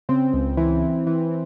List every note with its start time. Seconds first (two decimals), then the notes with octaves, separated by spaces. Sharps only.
0.09 C#3 C4
0.33 C#2
0.57 E3
0.82 E3
1.07 E3